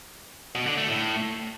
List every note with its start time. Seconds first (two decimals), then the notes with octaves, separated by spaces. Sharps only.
0.55 B2
0.66 D3
0.77 A3
0.89 A2